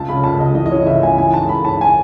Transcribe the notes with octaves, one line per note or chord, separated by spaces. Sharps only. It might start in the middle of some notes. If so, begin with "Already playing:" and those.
Already playing: C#2 A5
C#3 B5
C#2 A5
C#2 D#5
E3 D#5
D#5
E3 C#5
C#2 E5
C#3 G#5
E3 G#5
G#2 A5
G#2 B5
G#2 A5
G#5